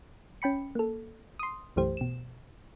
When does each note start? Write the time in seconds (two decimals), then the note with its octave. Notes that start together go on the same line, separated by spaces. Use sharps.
0.42 C#4 G5 B5 C#7
0.75 A#3 A4
1.39 C6 D#6
1.76 B1 F#2 E3 A3 G4 C5
1.97 B2 E7